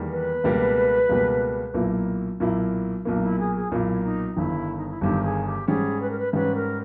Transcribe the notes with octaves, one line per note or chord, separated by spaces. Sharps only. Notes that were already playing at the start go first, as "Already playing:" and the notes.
Already playing: E2 D#3 G3 A#3
B4
C#2 B2 G3 A#3
C#2 B2 G3 A#3
B1 A#2 A#3 E4
B1 A#2 A#3 E4
B1 A#2 A#3
D#4
E4
G#4
G#4
B1 A#2 A#3 E4
D#4
G1 G2 D#3 E4
D#4
E4
G1 G2 D#3 G4
G#4
G4
G#2 G3 C#4 G#4
B4
A#4
B4
G#2 G3 C#4 B4
A#4